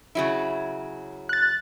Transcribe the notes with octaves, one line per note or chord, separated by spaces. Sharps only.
C#3 F#3 E4
F#6 A6